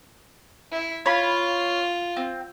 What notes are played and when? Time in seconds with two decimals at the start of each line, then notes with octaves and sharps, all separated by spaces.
0.72 E4
1.06 F4 C#5 F5 B5
2.17 C4